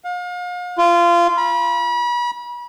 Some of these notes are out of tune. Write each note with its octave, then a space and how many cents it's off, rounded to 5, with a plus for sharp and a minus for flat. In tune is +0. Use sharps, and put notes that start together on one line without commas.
F5 +40
F4 -20
B5 -35